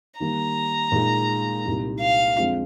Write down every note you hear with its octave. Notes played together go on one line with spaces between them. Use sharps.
D#3 G3 A#3 A#5
A#2 G#3 D#4
C2 A#2 G3 A#3 D#4
F5
F2 D3 G#3 C4 F4